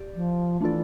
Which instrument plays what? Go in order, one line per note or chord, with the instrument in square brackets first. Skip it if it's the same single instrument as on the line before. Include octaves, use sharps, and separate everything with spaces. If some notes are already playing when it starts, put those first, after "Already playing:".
Already playing: [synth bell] G4 D5
[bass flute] F3
[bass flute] E3 [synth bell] A3 D4 F4 A4 D5